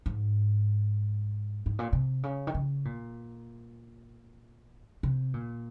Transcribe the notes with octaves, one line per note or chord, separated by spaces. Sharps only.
G#2
G#2
A#2
C3
C#3
D#3
C#3
A#2
C3
A#2